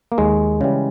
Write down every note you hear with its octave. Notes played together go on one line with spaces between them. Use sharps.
A#3
D#2 G#3
C#3 E3 G3